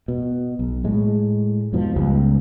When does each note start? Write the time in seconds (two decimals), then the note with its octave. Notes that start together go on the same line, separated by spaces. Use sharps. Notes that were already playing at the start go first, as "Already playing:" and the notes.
0.08 B2
0.59 B1
0.84 A2 G#3
1.72 F2 G#2 B2 F3
1.96 C#2 G3 B3